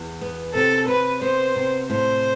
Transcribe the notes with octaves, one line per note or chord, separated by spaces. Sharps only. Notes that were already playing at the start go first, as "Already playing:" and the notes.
Already playing: E2
B3
C3 A4
C3 B4
B3 C5
C3
A2 C5